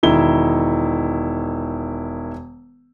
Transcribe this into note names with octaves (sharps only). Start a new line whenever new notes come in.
E1 D#3 E4 G7